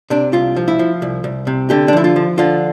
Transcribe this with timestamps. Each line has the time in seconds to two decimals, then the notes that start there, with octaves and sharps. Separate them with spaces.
0.10 C3 D4
0.33 C2 F4
0.56 F3
0.68 E4
0.79 F3
1.02 C2
1.24 C2
1.47 C3
1.70 D3 G4
1.88 D4
1.93 F3 E4
2.04 F4
2.16 F3
2.38 D3 F4